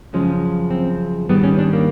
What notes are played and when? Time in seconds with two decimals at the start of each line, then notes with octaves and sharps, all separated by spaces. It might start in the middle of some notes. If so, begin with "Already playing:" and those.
0.13 F#2 C#3 F3 G#3 C#4
0.70 C4
1.29 G#2 D#3 G3 B3
1.43 C#4
1.59 D4
1.73 A#3